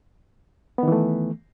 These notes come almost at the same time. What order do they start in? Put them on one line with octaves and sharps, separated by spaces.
B3 D#3 E3 A3